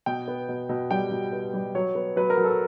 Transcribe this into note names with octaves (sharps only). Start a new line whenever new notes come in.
B2 G5
B3
B2
B2
G3 G5
B2
B3
G3
F#3 C#5
B3
F#3 B4
A#4
F#3
A4